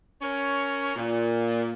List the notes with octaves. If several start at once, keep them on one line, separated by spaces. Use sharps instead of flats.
C#4 A#4 C#5
A#2